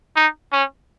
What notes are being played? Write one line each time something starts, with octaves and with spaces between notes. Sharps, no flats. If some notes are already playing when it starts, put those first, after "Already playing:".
D#4
C#4